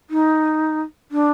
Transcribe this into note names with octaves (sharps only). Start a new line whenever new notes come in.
D#4
D4